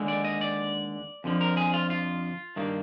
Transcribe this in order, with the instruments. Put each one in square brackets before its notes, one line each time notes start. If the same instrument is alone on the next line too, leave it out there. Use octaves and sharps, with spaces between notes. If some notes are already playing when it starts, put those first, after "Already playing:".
Already playing: [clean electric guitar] D#2 D3 G#3
D5
D#5
D5
F2 D3 F3
A#4
G#4
F4
F4
G2 D#3 A#3